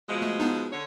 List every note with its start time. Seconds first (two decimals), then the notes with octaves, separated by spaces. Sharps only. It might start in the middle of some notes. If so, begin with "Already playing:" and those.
0.08 B2 F3 G#3
0.22 A3
0.40 B3 D4 D#4
0.72 D3 C#5